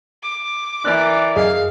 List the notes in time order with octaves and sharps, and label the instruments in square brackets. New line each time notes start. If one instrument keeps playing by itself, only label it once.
[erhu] D6
[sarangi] E3 [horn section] A#4 D5 [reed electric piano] F#6
[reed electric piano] F#2 G#4 D#5 [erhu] F5